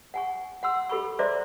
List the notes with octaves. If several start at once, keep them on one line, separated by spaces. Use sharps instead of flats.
F#5 G#5 C#6
F#5 C6 E6
G4 A4 B5 C#6
C5 D5 E5 A#5 C6 D6